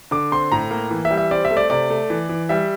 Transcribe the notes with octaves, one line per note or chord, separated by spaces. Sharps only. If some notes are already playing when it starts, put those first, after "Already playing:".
D3 D6
C4 C6
A2 A#5
A#3
E3
E5
G3
E5
C4 D5
E5
A3
D5
C3 D5
A3
E3
E3
G3 E5